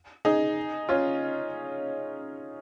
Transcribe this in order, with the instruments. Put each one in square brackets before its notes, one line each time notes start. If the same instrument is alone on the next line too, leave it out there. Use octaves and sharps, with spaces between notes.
[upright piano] D#4 G#4
C#4 F4